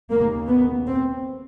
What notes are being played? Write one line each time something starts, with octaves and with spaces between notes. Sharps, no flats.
D#2 C#3 A#3
B3
C4